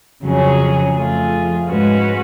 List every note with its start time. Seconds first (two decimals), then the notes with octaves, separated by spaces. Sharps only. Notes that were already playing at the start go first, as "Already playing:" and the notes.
0.24 F2 C#3 F#3 C#4 G#4
0.95 F2 F3 A3 F4 G#4
1.68 G#2 G#3 C#4 F#4 B4